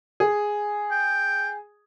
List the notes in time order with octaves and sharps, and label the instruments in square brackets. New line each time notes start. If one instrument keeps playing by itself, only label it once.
[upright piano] G#4
[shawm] G5